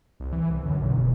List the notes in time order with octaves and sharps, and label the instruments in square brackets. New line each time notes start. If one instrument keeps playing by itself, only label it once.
[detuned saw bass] C2
E3
C2
[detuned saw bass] F#2 [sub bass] D3
[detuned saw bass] B1 [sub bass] B2
[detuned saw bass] D#1